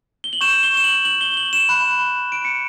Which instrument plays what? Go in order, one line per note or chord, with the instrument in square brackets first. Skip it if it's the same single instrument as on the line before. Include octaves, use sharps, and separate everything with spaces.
[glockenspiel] G7
F#7
C#6 G6 E7
G7
E7
F#7
F#7
G7
F#7
E7
B5 F#6
D7
C#7